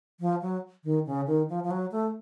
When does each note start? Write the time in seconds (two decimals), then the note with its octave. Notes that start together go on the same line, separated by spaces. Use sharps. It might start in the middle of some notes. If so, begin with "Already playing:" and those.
0.20 F3
0.42 F#3
0.84 D#3
1.06 C#3
1.28 D#3
1.49 F3
1.64 F3
1.71 F#3
1.92 A3